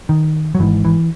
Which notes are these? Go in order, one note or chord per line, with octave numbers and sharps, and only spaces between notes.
D#3
F#3
G#1 G#2 E3
E3